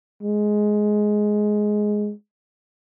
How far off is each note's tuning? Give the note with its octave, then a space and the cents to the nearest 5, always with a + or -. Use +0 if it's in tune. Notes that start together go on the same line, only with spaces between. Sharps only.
G#3 +10